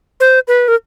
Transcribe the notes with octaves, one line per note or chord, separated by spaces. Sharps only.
C5
B4
A#4